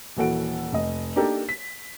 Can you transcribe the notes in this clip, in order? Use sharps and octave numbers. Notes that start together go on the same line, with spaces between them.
D#1 E3 F#4 A4 F#5 D7
F1 D#5
A#3 D4 D#4 G4 A4 A#4
B6